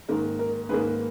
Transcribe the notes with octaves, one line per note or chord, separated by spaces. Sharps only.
G#2 D#3 A#3 A#4
A#4
G#2 D#3 A#3 G#4 B4